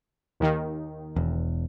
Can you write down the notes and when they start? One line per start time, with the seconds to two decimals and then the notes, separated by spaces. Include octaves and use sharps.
0.40 D#2 D#3
1.16 E1 E2